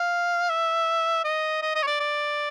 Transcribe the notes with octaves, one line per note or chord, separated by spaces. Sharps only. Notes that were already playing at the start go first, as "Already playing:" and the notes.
Already playing: F5
E5
D#5
D#5
D#5
C#5
D5
D5